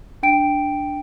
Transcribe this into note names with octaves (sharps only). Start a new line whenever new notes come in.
D4 G5 D7